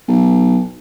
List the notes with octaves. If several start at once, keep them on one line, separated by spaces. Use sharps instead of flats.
B1